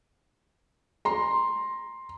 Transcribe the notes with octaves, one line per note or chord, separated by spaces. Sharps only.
A#5 C6